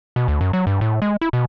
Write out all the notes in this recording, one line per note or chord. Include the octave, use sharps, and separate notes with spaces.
B2
D2
F#2
F#3
G2
A2
G#3
E4
B2